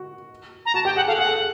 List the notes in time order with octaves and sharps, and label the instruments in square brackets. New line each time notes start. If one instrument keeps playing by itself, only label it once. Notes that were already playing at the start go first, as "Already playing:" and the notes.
Already playing: [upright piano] F#4
[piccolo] A#5
[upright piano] F#4 [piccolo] A5
[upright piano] G4 [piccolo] G5
[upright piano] G#4 [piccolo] F#5
[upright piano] A4 [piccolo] F5
[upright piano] G#4 [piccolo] F#5
[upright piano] A4
G#4